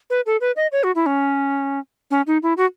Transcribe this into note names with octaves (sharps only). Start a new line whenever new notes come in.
B4
A4
B4
D#5
C#5
F#4
E4
C#4
C#4
D#4
E4
F#4